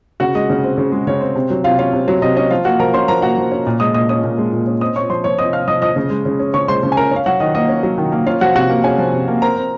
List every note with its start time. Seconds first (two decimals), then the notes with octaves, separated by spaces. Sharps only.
0.20 C#3 F#4 F#5
0.35 G#3 D#5
0.50 C#3
0.63 C4
0.78 C#3
0.92 G#3
1.07 C#3 C#5
1.21 C4
1.35 C3
1.50 F#3
1.64 C3 F4 F5
1.79 C#4 F4 F5
1.93 C3
2.08 F#3
2.22 C3 D#5
2.36 C#4 D#5
2.51 F3 F4 F5
2.65 A#3 F#4 F#5
2.80 F3 A#4 A#5
2.94 C#4 C5 C6
3.08 F3 A#4 A#5
3.22 A#3 F#4 F#5
3.37 F3
3.51 C#4
3.67 A#2
3.80 G#3 D#5 D#6
3.94 A#2 D#5 D#6
4.09 C#4 D#5 D#6
4.24 A#2
4.38 G#3
4.53 A#2
4.67 C#4
4.81 C4 D#5 D#6
4.95 C4 C#5 C#6
5.10 F3 C5 C6
5.24 F3 C#5 C#6
5.39 C4 D#5 D#6
5.53 C4 F5 F6
5.68 F3 D#5 D#6
5.82 F3 D#5 D#6
5.96 C#3
6.10 G#3
6.25 C#3
6.40 C#4
6.54 C#3 C#5 C#6
6.68 G#3 C5 C6
6.83 C#3
6.92 G#5
6.97 C#4 A#4 A#5
7.11 C#4 F5
7.26 F#3 F#4 F#5
7.40 D#3 D#5
7.55 A#3 D#5
7.69 C#4
7.83 F#3
7.98 D#3
8.12 A#3
8.26 C#4 F4 F5
8.41 F3 F#4 F#5
8.55 C3 F#4 F#5
8.70 A#3
8.84 C#4 G#4 G#5
8.98 F3
9.13 C3
9.28 A#3
9.42 C4 A#4 A#5
9.56 C4